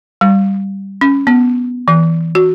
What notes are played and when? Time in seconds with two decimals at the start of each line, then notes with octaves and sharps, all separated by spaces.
0.21 G3
1.01 C#4
1.27 B3
1.88 E3
2.35 F#4